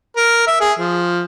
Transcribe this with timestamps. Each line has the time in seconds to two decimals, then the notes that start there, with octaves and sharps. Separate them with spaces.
0.16 A#4
0.47 E5
0.61 G#4
0.79 F3